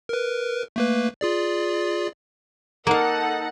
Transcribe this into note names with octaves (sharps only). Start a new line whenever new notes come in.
A#4 B4
A3 A#3 B4
F4 G#4 D5
A#3 D#4 A4 A#4 F5 F#5